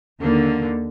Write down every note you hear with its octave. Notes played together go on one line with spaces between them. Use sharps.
D#2 D3 A#3